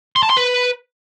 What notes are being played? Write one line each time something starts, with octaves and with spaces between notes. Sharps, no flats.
C6
A5
C6
B4